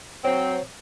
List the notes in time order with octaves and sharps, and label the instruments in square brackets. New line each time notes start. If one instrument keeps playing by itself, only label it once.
[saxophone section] F#3 C4 [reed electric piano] C#5